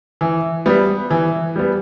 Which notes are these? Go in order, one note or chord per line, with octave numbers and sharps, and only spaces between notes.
E3
G3 B3
E3
G3 B3